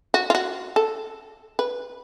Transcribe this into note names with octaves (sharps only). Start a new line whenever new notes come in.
F#4
F4
F#4
A4
B4